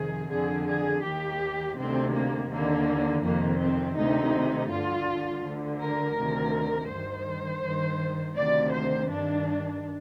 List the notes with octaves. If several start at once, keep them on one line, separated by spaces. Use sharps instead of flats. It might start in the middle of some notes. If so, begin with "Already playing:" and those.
Already playing: F2 C3 D#3 G#4
F2 D3 G#4
G#4
D#2 D#3 G4
D2 C3 D#3 C4
A#3
D#2 D3 A#3
F2 C3 D#3 A#3
C4
D2 C3 D#3 D#4
G2 D3 F4
D2 D3
A#4
D2 C3 D#3
G2 D#3 C5
G2 D#3
D2 C3 D#3 D5
C5
G2 D#3 D4